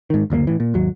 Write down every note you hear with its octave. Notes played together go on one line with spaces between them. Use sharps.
G#2 D#3
F#1 D2 C3 A#3
A2 E3
A#2
G#1 D#2 F#3